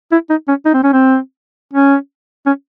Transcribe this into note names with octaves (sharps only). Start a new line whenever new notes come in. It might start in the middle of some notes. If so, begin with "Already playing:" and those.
E4
D#4
C#4
D#4
C4
C#4
C4
C#4
C#4